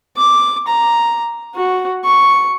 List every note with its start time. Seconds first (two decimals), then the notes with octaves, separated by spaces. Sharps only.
0.17 D6
0.67 A#5
1.55 F#4
2.05 C#6